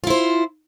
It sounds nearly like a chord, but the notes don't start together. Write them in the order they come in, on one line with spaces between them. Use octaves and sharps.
F4 E4 C5